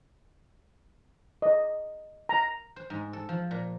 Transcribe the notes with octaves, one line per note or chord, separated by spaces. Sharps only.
D#5
A#5
C5
G#2
A4
F3
A#2